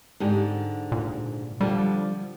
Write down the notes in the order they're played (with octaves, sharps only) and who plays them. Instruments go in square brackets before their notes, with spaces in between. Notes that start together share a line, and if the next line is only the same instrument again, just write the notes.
[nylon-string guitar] G#2 D3 G4
[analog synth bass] A#2
[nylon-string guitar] D3 F3 [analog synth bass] G3